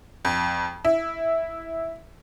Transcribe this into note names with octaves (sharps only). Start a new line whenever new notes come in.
F2
E4